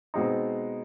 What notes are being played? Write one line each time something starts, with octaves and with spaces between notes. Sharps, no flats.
B2 G#3 C4 D#4